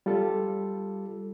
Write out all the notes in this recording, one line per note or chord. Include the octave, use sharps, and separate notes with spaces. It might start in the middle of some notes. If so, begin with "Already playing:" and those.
G3 F4 G4 A4